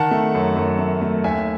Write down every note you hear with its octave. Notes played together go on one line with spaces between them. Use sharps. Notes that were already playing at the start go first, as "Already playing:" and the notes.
Already playing: D#3 F#5 A5
A3
F#2
F#2
A3
A3
D#2 E5 G#5